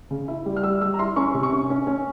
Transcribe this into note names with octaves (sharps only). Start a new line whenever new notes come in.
C#3
E4
G3
F6
G3 E6
G3 E6
A#5
E4 C6
C#4 C#6
C3
C#6
C#4
C#4
C#4